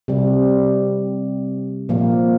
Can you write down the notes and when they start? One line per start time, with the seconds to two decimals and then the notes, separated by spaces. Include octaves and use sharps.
0.08 C3 G3
1.89 A#2 F3 A#3